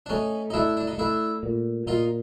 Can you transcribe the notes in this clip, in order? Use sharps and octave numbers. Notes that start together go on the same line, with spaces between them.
D4
A3 C#4 D#4
D#4
A3 D4 E4
D4
D#4
A3 D4 E4
A#2
A#2 D#4 F4